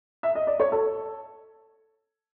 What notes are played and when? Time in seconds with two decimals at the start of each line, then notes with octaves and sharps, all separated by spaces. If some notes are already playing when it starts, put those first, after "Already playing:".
0.23 E5
0.35 D#5
0.47 D5
0.60 C#5
0.72 A4